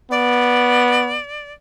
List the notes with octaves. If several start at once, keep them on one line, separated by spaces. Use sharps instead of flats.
B3 D5